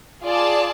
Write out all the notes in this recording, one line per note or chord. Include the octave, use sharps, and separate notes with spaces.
F4 G#4 D5 A5